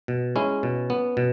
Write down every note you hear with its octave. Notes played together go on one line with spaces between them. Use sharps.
B2
G#3 C#4 E4
B2
B3
B2